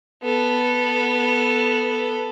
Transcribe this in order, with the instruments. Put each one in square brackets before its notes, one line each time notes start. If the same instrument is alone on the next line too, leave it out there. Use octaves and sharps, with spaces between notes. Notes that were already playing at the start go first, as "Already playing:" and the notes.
[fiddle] B3 A4